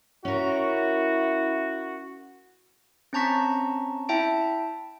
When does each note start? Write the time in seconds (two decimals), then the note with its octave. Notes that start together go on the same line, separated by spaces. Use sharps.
0.25 C#4 E4 F#4 A#4
3.13 C4 C#4 A5 A#5 C#6 B6
4.09 E4 E5 G5 A5 D7